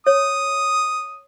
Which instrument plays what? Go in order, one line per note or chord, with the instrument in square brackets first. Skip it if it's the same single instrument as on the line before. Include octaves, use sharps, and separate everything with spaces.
[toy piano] C#5 [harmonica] D#6